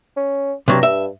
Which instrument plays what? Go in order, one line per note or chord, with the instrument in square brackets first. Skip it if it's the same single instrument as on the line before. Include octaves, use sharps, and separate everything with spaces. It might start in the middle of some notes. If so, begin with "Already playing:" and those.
[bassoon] C#4
[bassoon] G2 [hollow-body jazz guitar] C3 F#3
[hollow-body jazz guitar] E5